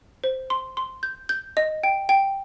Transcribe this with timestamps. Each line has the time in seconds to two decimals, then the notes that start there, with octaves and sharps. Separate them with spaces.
0.24 C5
0.50 C6
0.77 C6
1.03 G6
1.29 G6
1.57 D#5
1.84 G5
2.09 G5